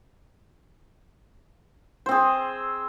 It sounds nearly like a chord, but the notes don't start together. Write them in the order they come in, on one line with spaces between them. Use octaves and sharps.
C5 C4 G#4